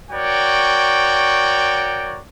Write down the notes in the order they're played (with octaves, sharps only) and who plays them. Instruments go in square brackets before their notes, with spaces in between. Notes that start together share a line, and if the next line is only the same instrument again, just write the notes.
[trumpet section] F#4 A#4 C#5 D5 G5